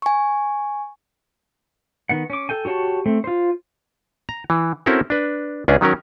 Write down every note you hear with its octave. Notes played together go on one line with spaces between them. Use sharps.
G#5 C#6
D#3 B3 F#5
C#4 D6
A4 G5 G#5
F#4 G4 C#5 F#5 A5
A3 C4
F4 C5
A#5
E3
C4 C#4 E4 F#4 A4 A#4
D4 B4
C#2 C#4 D4 G#4
D#3 F#3 C#4 A#4